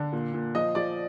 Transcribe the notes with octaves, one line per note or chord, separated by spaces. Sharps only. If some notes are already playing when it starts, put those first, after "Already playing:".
Already playing: D3
A#2
A#2
F3 D#5
F3 D5